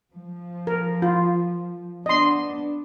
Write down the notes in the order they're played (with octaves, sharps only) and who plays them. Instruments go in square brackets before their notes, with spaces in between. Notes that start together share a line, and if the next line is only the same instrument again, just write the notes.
[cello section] F3
[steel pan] A#4
F4
[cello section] B3 D4 [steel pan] D#5 C6